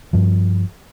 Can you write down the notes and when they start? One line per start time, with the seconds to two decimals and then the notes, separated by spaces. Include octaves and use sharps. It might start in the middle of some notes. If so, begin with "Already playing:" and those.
0.13 G2 F3